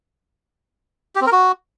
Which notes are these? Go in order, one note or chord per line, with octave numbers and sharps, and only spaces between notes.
G4
C4
A#4
F#4